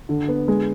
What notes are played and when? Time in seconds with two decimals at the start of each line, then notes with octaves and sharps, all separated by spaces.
0.09 D3
0.28 B3
0.48 G#3